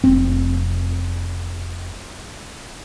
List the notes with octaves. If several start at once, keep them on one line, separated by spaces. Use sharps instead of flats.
F1 C4